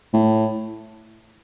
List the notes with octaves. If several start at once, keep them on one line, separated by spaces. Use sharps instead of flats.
A2